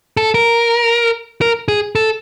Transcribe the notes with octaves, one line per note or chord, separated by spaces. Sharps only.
A4
A#4
A#4
G#4
A4